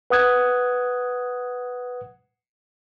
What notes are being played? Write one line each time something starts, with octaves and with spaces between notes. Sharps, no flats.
B4 F#5 D#6 F#6 G#6